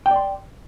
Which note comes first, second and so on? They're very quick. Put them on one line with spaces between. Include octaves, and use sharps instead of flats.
G5 D5 C6